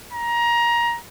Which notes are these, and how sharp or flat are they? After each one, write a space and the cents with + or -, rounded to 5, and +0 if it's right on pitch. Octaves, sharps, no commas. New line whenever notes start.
A#5 +20